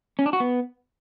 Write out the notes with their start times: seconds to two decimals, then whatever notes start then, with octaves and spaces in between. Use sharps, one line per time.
0.19 C#4
0.26 D4
0.33 F#4
0.40 B3